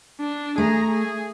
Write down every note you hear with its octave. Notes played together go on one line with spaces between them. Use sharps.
D4
A3 G#4 A#5
G#4